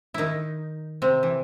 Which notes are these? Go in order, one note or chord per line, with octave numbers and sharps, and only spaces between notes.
D#3 D#4 E4
C3 C4
E3